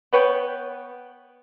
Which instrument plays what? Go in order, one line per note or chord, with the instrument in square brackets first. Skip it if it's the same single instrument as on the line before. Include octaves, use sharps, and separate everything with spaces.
[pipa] B3 B4 C#5 G5